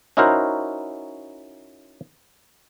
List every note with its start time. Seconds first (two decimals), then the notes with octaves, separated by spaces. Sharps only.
0.17 C#4 D#4 E4 F#4 A#4 C5